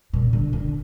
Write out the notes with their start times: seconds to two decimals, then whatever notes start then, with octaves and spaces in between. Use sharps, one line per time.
0.13 A#2
0.33 D3
0.53 D3